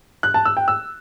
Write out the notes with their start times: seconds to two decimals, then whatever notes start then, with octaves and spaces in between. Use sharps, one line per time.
0.23 F#6
0.34 A5
0.45 E6
0.57 G5
0.68 E6